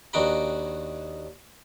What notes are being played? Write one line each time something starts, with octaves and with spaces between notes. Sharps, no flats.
D#2 D4 D#4 F#4 G5 B5